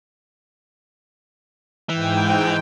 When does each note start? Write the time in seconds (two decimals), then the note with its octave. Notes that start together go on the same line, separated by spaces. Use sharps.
1.89 G#2 E3 G5